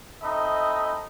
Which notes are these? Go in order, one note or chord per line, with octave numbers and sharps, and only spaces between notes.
C4 D#4 A4 D#5 E5 B5